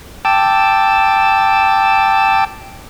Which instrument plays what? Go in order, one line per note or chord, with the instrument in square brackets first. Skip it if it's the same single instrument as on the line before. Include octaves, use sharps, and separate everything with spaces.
[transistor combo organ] G5 A5 D6 E6